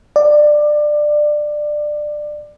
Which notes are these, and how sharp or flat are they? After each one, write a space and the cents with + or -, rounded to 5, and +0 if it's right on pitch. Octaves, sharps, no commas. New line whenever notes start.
D5 +20